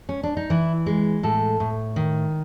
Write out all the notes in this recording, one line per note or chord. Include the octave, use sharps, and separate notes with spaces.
C#4
D4
D#4
E3 E4
G#3
A2 A4
A2
D#3